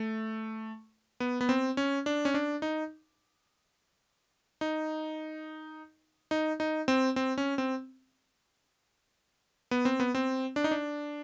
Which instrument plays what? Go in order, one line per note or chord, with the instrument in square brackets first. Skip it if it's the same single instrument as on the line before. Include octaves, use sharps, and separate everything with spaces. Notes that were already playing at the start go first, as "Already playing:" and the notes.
Already playing: [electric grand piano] A3
B3
B3
C4
C#4
D4
C#4
D4
D#4
D#4
D#4
D#4
C4
C4
C#4
C4
B3
C4
B3
C4
D4
D#4
D4